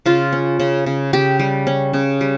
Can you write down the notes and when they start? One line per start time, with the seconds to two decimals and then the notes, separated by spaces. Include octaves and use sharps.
0.06 C#3 F4
0.33 C#4
0.60 C#3
0.86 C#3
1.13 C#3 G4
1.39 G3
1.67 C#4
1.93 C#3
2.21 G3